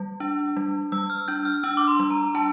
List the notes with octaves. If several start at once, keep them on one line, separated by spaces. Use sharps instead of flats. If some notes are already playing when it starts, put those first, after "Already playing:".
Already playing: G3
D4
G3
G3 E6
F6
D4 G6
F6
D4 E6
D6
C6
G3
A#5
D4 A5